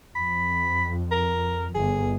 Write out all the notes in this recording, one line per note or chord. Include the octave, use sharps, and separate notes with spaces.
F2 B5
A#4
G1 G#4